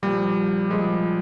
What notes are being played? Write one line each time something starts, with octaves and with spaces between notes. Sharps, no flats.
A#2 F3 G3
A#2 F3 G#3